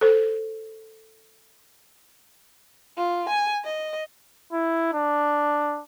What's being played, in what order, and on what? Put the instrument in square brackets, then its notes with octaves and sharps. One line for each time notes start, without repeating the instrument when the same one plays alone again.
[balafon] A4 C5
[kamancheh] F4
G#5
D#5
[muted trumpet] E4
D4